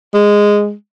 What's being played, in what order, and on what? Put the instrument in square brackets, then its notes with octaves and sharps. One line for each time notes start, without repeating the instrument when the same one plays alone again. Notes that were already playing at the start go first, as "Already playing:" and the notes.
[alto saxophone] G#3